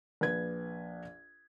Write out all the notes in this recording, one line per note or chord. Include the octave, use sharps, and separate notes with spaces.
A#1 B4 G#6